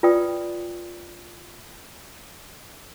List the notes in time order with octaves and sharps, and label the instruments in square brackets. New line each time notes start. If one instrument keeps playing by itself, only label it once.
[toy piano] F4 B4 D5 G5 D#6